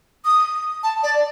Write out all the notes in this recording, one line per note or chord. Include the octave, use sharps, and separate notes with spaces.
D#6
A5
D5